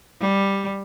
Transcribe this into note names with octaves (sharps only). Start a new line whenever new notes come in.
G3